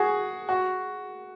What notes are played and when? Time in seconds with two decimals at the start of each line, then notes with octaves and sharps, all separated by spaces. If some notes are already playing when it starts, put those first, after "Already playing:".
Already playing: F#4 G#4
0.49 F#4